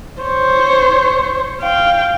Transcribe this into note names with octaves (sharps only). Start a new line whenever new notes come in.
C5 C#5
F5 G5